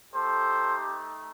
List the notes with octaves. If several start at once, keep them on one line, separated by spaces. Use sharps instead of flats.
A3 D#4 G4 A4 C5